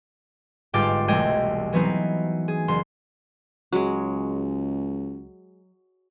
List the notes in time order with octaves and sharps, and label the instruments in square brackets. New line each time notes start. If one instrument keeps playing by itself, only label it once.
[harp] G1 G#2 F4 G5 D6 A6
E1 C2 A3 D#5 G5 G#6
E3 F#3 B3 C4 D#4
G#4
F#1 C6
[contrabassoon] C#2 [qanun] F#3 G#3